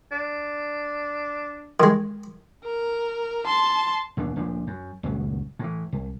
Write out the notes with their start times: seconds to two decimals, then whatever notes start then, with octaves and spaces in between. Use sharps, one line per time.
0.11 D4
1.80 D#3 G#3
2.65 A#4
3.46 A5 C6
4.17 A1 D#2 B2 D4
4.36 D1 A#1 F3 D4
4.67 F#2
5.03 D#1 C#2 F#2 F#3
5.59 A2 E3
5.92 C2